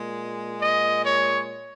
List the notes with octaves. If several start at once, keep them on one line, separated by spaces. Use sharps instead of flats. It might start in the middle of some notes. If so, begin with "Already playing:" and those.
Already playing: A#2 G#3
D#5
C#5